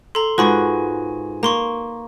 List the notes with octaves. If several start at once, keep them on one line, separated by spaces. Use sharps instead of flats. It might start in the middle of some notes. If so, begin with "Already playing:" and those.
A4 A#5 C6
G#2 F4 F#4 G#4 B4 G#5 B5 C#6
A#3 A#5 C6 C#6